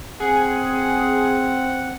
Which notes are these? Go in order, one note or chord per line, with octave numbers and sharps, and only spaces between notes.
C4 G#4 F#5